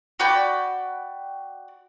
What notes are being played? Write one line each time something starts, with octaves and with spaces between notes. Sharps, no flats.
F#4 D5 G5 B5